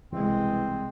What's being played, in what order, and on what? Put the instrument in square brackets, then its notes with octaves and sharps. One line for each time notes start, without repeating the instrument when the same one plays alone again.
[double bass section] C2 B2 G#3 [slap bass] E3 [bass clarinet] C4